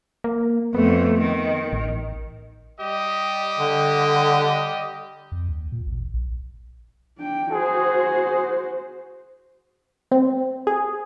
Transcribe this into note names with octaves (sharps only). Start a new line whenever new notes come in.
A#3
F2 A3 B3
D#3
A1
G3 G4 D#5
D3
F2
D#2
A#2
A1
A#1
D4 G5
F#4 G#4 C5
C4
G#4